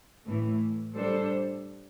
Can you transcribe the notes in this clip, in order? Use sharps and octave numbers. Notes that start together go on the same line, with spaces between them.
A2 E3 A3
G3 D4 A4 C5